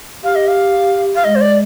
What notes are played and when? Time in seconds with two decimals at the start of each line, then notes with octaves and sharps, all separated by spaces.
0.23 G4 F5
0.35 D#5
0.48 F5
1.15 F5
1.24 G#3 D#5
1.35 C5
1.41 D5